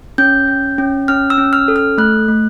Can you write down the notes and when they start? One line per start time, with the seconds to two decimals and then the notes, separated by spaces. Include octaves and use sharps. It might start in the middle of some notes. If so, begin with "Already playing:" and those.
0.18 C#4 G6
0.48 C#4
0.78 C#4
1.08 C#4 F6
1.30 E6
1.38 C#4
1.53 F6
1.68 A4
1.76 F6
1.98 A3 F#6
2.28 A3